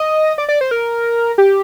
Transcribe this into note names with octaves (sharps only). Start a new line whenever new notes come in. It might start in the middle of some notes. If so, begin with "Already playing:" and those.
Already playing: D#5
D5
D5
C5
A#4
G4